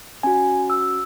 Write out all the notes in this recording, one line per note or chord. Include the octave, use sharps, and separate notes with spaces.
C#4 F#4 G#5
E6